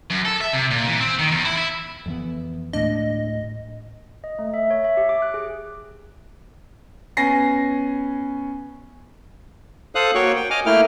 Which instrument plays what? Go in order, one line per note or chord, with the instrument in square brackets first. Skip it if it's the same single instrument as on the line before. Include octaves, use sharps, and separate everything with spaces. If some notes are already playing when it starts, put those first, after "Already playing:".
[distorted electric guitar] F#2
A4
E5
C3
A#2
E3
C4
D#3
E2
E4
E4
[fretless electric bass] F2 E3 B3
[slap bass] D2 A2 G#3 [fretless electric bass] D4 [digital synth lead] D#5
[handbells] D#5
A3
E5
C#5
E5
G4
D6
F#6
G#4
[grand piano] B3 C#4 G#5 A#6 C7
[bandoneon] A4 C5 F5 D#6 F#6
A#3 F#4 C#5 G5 C#6
G5
D#5 G#5 D6 F6
A3 A#3 E4 G5 F6